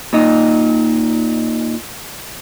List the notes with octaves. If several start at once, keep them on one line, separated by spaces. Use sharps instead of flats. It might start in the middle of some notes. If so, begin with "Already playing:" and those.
A#2 D#4